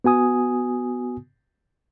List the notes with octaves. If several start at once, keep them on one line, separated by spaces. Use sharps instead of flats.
B3 F#4 G#5 D#6